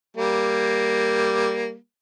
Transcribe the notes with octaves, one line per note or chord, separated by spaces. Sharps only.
G3 A#3